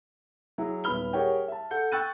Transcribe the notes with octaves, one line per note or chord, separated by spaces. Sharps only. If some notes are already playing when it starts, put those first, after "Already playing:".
F#3 E4 G#4
D#1 B3 B5 F6 G7
G4 G#4 A#4 C#5 F#5 G5
E5 A5
A4 F#5 G6 C#7
G5 C#6 E6 F#6 A6 D#7